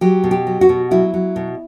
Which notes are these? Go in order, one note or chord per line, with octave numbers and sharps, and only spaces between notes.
F#3 G4
B2
G4
F#3
F#4
B2
F#3 E4
F#3
B2